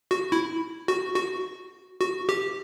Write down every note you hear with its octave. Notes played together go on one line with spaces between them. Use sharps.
F#4
E4
F#4
F#4
F#4
G4